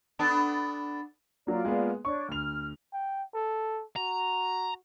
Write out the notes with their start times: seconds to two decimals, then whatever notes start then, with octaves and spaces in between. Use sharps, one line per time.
0.19 B3 D4 A4
1.47 F#3 A#3 F4 D5 F5
1.65 G#3 A#3 B3
2.05 D4 C#5 C#6
2.28 D2 F6 F7
2.93 G5
3.34 A4
3.96 F#4 A#5